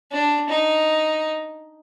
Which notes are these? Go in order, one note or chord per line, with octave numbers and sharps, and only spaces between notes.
D4
D#4